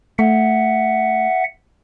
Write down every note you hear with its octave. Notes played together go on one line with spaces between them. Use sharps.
A3 E5 F#5